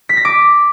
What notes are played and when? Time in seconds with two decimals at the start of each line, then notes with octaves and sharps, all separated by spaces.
0.09 B6
0.17 A#6
0.25 D6